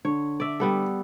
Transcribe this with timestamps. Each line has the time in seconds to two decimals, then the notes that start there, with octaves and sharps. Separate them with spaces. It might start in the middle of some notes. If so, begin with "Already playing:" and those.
0.05 D3 C#5
0.40 D5 E5
0.60 G3 B3 A4